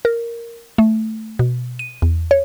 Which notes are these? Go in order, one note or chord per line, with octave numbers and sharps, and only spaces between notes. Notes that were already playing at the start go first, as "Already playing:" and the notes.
A#4
A3
B2
D#7
E2
C#5